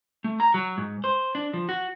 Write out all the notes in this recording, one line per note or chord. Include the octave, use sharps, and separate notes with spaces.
A3
A#5
F#3
G#2
C5
D4
F3
F#4